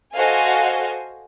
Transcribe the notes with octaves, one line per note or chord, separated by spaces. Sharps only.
F#4 A4 C5 D#5 F5 G#5